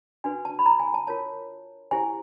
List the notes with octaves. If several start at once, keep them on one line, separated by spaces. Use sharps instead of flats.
D4 F#4 B4 G#5
A5
B5
A#5
G#5
A5
F4 A#4 C#5 A5
E4 G4 C5 G#5